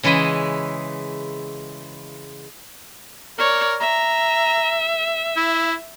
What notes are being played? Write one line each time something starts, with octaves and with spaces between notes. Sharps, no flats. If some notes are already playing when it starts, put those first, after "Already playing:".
C#3 E3 G#3 E4 D#5
A#4 C#5 D5
E5 A#5
E4